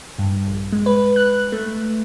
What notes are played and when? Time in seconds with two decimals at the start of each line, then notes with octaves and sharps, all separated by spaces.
0.19 G2
0.47 A#1
0.72 G#3
0.86 B4
1.16 F#6
1.52 A3